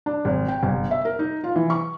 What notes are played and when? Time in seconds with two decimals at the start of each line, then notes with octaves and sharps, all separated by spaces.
0.06 D4
0.25 G#1
0.48 G5
0.63 G1
0.91 E5
1.05 A#4
1.19 D#4
1.44 F4
1.56 E3
1.70 C#6